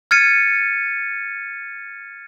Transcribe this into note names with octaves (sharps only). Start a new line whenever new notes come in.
F6 G#6 A6 C#7 D#7